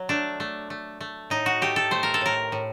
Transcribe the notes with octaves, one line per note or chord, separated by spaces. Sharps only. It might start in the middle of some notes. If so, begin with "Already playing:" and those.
Already playing: F#3
A3 D4
A3
A3
A3
A2 D#4
F#4
A3 G4
A4
A3 C5
A#4
A4
A2 A#4
A2